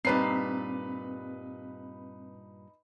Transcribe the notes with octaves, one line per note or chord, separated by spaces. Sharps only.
G2 A#2 G3 C4 D#4 B4 C7